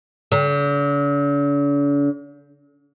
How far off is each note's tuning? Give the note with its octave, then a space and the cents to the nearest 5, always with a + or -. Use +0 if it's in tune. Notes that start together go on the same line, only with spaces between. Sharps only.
D3 -45